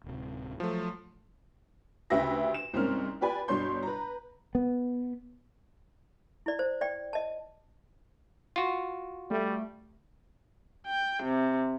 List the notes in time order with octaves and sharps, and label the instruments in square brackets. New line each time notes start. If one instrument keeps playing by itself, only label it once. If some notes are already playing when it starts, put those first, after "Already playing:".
[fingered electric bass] D1 C3
[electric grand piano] F3 A3 [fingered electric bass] F#3
[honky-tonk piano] D2 C#3 G4 B4 E5 A#6
E7
C2 G#2 A#3 C4 C#4 F6
F4 G4 B4 D5 G#5 B5
G1 B2 D4 C#5 C6 G6
B4 A#5
[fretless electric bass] B3
[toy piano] E4 D5
C5
D5 G5
D#5 A5
[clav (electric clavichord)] F4 F#4
[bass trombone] G3 [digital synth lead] A3
[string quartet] G5
C3